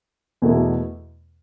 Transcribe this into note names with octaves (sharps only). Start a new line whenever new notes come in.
E2 B2 A3 E4